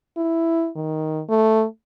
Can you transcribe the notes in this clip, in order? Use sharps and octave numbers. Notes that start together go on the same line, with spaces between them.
E4
D#3
A3